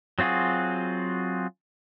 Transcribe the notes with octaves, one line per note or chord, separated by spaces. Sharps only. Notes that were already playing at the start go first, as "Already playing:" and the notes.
F#3 C4 F4 F#4 G#4